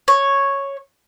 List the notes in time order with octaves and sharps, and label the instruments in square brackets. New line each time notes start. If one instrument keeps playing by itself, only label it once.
[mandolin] C#5